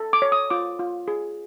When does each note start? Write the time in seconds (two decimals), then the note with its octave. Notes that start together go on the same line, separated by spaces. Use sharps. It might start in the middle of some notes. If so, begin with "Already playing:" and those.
Already playing: A4
0.13 D6
0.22 C#5
0.32 D#6
0.50 F4 D6
0.79 F4
1.08 G#4